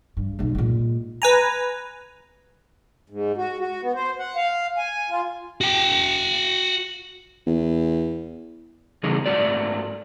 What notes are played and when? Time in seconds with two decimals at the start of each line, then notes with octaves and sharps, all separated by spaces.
0.17 G2
0.39 B1 G#3
0.55 A#2 G#3
1.22 B4 G#5 A#5
3.10 G#2
3.37 F#4
3.59 F#4
3.81 B3
3.95 C5
4.19 F#5
4.36 F5
4.78 G#5
5.10 F4
5.61 F#4 G5
7.46 E2
9.03 E2 C#3 G3 D#4 G#4
9.26 G#2 A3 F#4 D5